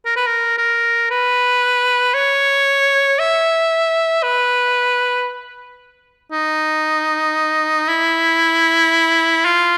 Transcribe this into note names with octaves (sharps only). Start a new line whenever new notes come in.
A#4
B4
A#4
A#4
B4
C#5
E5
B4
D#4
E4
F4